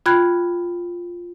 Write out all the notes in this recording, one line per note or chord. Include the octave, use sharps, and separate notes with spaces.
F4 G5 B5 F#6 G#6